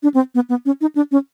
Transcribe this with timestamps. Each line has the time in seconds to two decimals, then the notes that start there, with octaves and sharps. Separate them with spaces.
0.03 D4
0.14 C4
0.35 B3
0.49 B3
0.65 C#4
0.81 D#4
0.95 D4
1.12 C#4